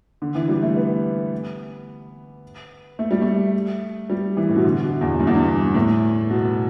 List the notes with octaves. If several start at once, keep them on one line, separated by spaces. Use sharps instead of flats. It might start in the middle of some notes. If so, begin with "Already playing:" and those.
D3
E3
G3
A3
B3
A3
G3
A3
G3
E3
A2
B2
D3
B2
E2
G2
E2
G2
A2
B2